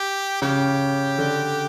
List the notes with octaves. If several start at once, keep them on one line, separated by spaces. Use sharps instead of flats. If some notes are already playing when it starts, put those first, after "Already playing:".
Already playing: G4
C#3 G4
D3